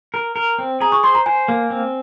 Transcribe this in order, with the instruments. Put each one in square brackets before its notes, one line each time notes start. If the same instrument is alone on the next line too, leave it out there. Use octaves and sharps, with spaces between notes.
[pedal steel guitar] A#4
A#4
C4
[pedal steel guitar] G#4 [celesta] A#5
[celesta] C#6
[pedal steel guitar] C5 [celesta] C6
[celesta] A#5
[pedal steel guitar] C5 [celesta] G#5
[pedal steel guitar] A#3
C4